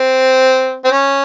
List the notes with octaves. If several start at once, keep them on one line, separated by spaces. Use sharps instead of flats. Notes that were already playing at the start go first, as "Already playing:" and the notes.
Already playing: C4
C4
C#4